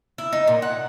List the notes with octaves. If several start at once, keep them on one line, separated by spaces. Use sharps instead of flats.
E4
D#4
A#2
F#5